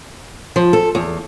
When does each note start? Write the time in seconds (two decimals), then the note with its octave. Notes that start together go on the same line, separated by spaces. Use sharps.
0.56 F3
0.73 A4
0.95 E2